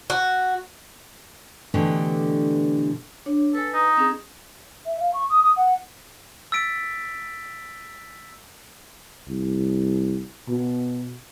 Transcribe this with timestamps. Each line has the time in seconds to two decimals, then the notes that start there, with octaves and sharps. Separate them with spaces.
0.10 F#4
1.74 B2 D3 E3 A3 D4 G4
3.26 D4 C#5
3.55 A4 B4 G#5
3.74 D#4
3.97 C4 C#4 G#4
4.86 E5
5.00 F5
5.14 C#6
5.30 D#6
5.43 D#6
5.57 F#5
6.52 E6 A6 B6 D7
9.28 C2
10.49 B2